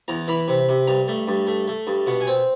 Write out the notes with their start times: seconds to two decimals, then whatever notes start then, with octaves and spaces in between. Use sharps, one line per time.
0.08 E2 A#5
0.28 E3 B5
0.48 C3
0.69 C3
0.87 G2 A#5
1.08 A3
1.28 G2
1.47 A3
1.68 A3
1.87 G2
2.07 B2 F#5
2.21 G#5
2.27 C4 G5